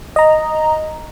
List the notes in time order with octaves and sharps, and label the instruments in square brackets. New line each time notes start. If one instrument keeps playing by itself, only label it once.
[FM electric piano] D#5 A#5